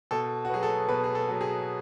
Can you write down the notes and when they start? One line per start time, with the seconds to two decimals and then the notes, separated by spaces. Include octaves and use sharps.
0.11 B2 A4
0.45 F#4
0.50 F#3 B3 G#4
0.63 A4
0.88 B2 B4
1.04 G#4
1.15 A4
1.28 F#3 B3
1.41 G#4